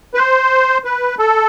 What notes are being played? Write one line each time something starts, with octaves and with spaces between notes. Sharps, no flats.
B4
C5
B4
A4